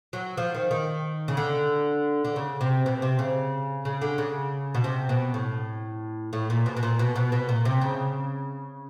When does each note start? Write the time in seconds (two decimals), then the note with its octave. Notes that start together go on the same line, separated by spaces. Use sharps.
0.13 F#3
0.37 F3
0.54 D#3
0.71 D#3
1.28 C#3
1.37 D3
2.25 D3
2.36 C#3
2.61 C3
2.86 B2
3.02 C3
3.19 C#3
3.85 C#3
4.02 D3
4.18 C#3
4.74 B2
4.84 C3
5.09 B2
5.34 A2
6.33 A2
6.50 A#2
6.66 B2
6.77 B2
6.83 A#2
6.99 B2
7.16 B2
7.32 B2
7.49 A#2
7.65 C3
7.81 C#3